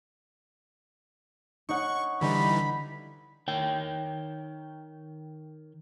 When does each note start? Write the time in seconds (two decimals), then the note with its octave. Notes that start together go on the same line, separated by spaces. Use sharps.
1.69 D#4 C#5 F#5 C#6
2.21 D3 E3 G3 D#4 B5
3.48 D#3 C#5 G5